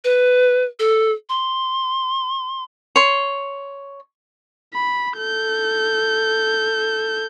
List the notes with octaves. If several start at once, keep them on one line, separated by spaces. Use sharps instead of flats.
B4
A4
C6
C#5 C6
B5
A4 G6